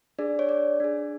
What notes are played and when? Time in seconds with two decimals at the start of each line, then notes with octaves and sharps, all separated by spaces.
0.19 D4 G#4 D5
0.39 C#5
0.49 D5
0.80 D4 G#4